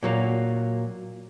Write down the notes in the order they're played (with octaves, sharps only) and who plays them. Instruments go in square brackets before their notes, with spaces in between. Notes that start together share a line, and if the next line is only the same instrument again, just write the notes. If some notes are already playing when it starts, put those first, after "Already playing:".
[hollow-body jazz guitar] A#2 F#3 A#3